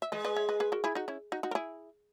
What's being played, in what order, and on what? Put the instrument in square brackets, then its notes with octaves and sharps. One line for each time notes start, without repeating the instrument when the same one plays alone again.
[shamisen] E5
[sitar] G#3 [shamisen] B4 D#5
[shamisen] B4 D#5
C#5 E5
B4 D#5
G#4 B4
F#4 A#4
E4 G#4
D#4 F#4
C#4 E4
D#4 F#4
D#4 F#4
A#4
E4 G#4